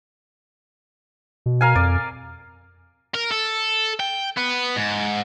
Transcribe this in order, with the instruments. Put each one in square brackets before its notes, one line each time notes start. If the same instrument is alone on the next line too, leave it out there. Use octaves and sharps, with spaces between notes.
[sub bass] B2
[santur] A#4 F5 G#5
[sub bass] F2 [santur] D5
[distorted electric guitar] A#4
A4
G5
B3
G#2